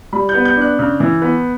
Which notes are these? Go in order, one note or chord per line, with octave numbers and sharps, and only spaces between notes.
G3 B5
G6
B3
G6
D4 F#6
C#3
E3
B3